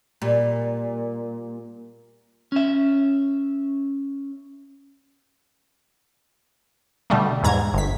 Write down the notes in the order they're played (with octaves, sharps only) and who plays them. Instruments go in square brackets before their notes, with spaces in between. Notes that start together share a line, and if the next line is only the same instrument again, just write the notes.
[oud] A#2 G3
[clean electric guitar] C#4 E5
[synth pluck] B2 D3 G3 A3
E2 G#2 A#5 G#6
G1 B6